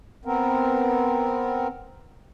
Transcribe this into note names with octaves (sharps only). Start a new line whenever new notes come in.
B3 C4 A#4